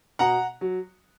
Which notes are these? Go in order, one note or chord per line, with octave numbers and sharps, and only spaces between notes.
B2 F#5 A#5
F#3